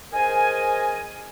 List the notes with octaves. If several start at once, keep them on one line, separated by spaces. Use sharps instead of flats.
G#4 A#4 C5 D#5 G#5